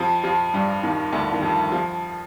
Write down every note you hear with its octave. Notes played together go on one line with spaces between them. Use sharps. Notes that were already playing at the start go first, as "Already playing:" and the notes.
Already playing: F2 F3
F2 F3
G2 G3
D#2 D#3
D2 D3
D#3
F2 F3
F2 F3